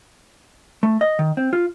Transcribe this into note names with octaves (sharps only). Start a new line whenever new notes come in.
A3
D#5
D#3
C4
F4